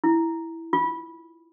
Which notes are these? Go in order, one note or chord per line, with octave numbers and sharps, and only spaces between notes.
E4
F4